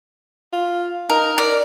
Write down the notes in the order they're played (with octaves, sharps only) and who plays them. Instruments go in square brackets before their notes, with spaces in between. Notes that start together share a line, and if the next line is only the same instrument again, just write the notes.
[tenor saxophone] F4
[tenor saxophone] D#4 [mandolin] A#4
[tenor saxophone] A#4 [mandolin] D5